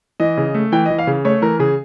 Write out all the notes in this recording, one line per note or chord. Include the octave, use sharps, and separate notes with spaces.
E3 D#5
C#3
A3
E3 G5
D#5
E3
F5
C#3
A3 C#5
E3 A#4
C#3 G#4